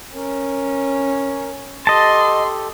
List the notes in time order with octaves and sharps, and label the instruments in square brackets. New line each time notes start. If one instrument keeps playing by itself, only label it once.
[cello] C#4 [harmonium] A#4
[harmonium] G4 A4 [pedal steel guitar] D#5 A5 [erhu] C6